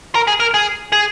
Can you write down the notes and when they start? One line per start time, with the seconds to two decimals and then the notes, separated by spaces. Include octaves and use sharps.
0.15 A#4
0.28 G#4
0.40 A#4
0.54 G#4
0.92 G#4